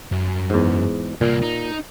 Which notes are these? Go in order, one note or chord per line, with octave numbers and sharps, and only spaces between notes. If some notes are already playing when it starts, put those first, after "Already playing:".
F#2
E2 G#2
C2 A#2 A#3
D#4